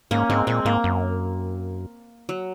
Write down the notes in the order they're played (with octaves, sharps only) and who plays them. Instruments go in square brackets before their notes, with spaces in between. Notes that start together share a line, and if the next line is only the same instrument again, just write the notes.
[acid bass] G#2 [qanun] A#3 C#4
[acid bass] G#2 [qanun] G#3 C4
[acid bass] A#2 [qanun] G#3 C4
[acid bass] G#2 [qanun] A#3
[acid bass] F#2
[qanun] F#3